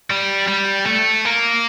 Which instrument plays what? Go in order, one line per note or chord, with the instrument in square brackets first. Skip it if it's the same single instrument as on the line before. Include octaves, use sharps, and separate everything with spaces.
[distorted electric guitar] G3
G3
A3
A#3